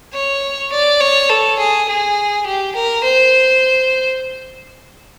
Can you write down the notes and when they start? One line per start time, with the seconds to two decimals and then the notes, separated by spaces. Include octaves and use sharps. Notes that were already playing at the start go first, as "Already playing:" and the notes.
0.13 C#5
0.72 D5
1.00 C#5
1.29 A4
1.58 G#4
1.88 G#4
2.46 G4
2.75 A#4
3.04 C5